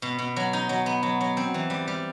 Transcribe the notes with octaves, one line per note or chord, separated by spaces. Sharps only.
B2
B2
F#3
D#4
F#3
B3
F#3
F#3
C4
E3
G3
G3